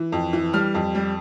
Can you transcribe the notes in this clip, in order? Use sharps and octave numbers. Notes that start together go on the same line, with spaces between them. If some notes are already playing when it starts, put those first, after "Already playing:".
Already playing: E3
F2
E3
G3 F6
F2
G3